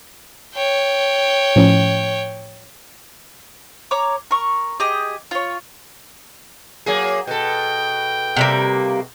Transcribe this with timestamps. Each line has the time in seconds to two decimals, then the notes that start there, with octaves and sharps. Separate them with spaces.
0.55 C#5 G5
1.56 A2 F3 C#4
3.91 C#5 A#5 D6
4.31 A#4 C#6
4.80 G4 G#4 D#5
5.31 F4 C#5
6.86 F#3 A#3 G#4
7.27 B2 A4 G5
8.36 C3 G3 A#3